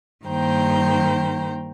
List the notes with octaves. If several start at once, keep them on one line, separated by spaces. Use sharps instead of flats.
G2 D#3 A#3 C5 G5 A#5